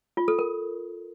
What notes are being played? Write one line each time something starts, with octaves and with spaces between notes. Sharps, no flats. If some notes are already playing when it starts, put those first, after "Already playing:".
F4
A4
A#4